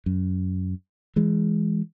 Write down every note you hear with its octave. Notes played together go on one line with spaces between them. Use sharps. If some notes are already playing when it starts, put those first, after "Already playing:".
F#2
E3 G#3